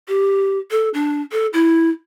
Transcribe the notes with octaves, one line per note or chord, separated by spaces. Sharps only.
G4
A4
D4
A4
E4